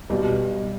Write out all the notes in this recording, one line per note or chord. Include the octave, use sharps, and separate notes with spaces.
B1 B2 G3